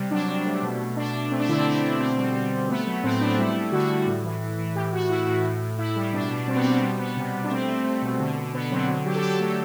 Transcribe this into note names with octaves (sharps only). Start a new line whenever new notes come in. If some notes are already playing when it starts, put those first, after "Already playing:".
Already playing: C3 G3
F#3 D4
C3
A3
B2
B2
B2 D4
B2
A3 C4
D4
D3 E4
C4
A3 D4
D3
B2 C4
G3
G3
G3
A3 B3
F#3
A2 C4
A3 D4
G3 E4
G3
D3 F#4
G3
A2
E3
E3
E3
A2 G4
A2 F#4
A2 E4
A2
A2
A2
A2 E4
G3
B2 D4
B2
G3 C4
B3
B2 C4
G3 B3
G3 B3
C3
G3
D4
A3 C4
A3
A3
B2
D3
D3
D3 B3
F#3 C4
D3 F#4
F#3 G4
A4
F#3 G4
A3 G4